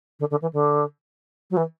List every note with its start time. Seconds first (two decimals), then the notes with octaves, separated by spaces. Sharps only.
0.20 D3
0.31 D3
0.42 E3
0.53 D3
1.51 F#3
1.57 E3